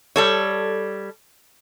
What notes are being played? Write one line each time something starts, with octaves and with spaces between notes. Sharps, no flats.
G3 A4 C#5